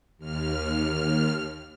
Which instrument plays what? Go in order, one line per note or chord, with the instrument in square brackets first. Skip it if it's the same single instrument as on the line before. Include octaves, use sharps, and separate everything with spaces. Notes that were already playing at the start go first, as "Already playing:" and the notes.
[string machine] D#2 F6